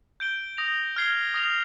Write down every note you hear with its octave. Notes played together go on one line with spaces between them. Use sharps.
G6 D7 G7
D#6 A#6 F7
F6 G#6 C7 G7
D#6 A#6 F7